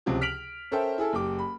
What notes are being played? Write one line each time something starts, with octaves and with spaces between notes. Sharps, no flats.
C#2 C3 F3
F6 B6 D7 F7 F#7
C#4 A4 A#4 C5 E5 G5
E4 G#4 A4
F#1 G4 D6
B5